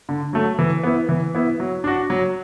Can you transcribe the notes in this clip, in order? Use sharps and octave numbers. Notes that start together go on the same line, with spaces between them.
D3
F#3 A3
E3
B3 E4
E3
B3 E4
F#3
D4 F#4
F#3